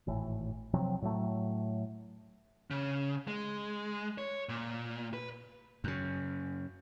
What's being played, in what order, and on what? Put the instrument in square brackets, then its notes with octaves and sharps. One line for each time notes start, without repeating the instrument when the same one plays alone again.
[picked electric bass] G#1 A2 E3
C3 F3 F#3 C4
A2 F#3 A3
[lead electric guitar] C#3
G#3
C#5
A#2
B4
[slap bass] F#2 C#3